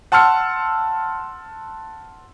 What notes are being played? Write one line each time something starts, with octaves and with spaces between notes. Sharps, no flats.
F#5 A5 C6 E6 F6 C#7